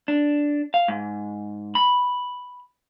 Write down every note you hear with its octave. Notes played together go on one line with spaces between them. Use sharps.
D4
F5
G#2
B5